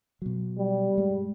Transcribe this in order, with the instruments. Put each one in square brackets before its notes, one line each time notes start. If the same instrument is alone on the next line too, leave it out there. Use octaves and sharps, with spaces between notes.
[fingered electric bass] B2 F#3
[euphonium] G3
[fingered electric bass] G2 G#3